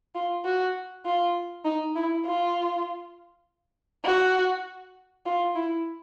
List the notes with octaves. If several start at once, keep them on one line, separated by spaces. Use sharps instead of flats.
F4
F#4
F4
D#4
E4
F4
F#4
F4
E4